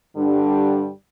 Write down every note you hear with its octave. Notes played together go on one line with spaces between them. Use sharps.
G2 D3 G3 D4